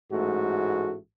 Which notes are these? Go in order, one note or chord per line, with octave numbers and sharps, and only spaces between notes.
A1 G#2 A3 F#4